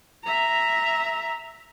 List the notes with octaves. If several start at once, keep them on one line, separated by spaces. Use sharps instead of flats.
E5 A#5